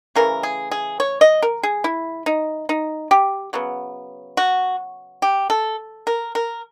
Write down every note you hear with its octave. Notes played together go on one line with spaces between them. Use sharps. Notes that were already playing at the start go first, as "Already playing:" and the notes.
C#3 E3 A3 A#4
G#4
G#4
C#5
D#5
A#4
G#4
E4
D#4
D#4
G4
C#3 F#3 B3
F#4
G4
A4
A#4
A#4